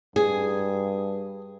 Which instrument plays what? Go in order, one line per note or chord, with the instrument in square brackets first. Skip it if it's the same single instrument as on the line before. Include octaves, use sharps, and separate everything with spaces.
[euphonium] G2 [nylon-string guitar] G#4